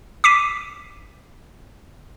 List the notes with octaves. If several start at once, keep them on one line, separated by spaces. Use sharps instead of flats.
D6 B6 C7 D#7